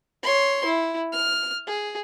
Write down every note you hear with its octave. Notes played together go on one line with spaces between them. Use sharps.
C#5 C6
E4
F6
G#4